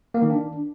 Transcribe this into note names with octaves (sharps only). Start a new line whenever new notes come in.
A#3
D#3
D4